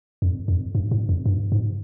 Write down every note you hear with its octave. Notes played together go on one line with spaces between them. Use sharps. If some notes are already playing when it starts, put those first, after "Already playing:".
F2
F2
G2
G#2
F2
G2
G#2